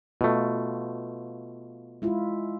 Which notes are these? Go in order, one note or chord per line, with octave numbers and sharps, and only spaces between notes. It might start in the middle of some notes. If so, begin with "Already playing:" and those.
B2 A3 F4
G#3 E4 F4